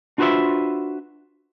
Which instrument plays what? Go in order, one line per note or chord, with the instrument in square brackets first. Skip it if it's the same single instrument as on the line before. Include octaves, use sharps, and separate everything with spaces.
[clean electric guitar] D4 F4 F#4 B4 C5 E5